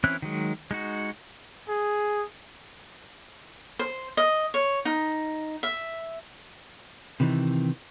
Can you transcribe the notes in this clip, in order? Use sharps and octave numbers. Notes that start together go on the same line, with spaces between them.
E3 C4 C#4 E4 F#6
D#3 F#3 G#3
G#3 D#4 F#4
G#4
C5
D#5
C#5
D#4
E5
C3 D#3 E3